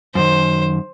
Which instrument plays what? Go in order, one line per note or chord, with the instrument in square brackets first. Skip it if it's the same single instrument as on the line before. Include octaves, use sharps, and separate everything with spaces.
[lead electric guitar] F#2 D#3 [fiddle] C5